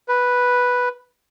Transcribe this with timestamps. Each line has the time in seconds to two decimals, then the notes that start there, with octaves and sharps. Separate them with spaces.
0.08 B4